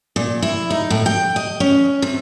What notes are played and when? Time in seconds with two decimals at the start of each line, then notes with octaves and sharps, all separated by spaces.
0.16 A#2
0.42 E4
0.70 D#4
0.90 A2
1.06 G5
1.36 D#5
1.60 C#4
2.02 C3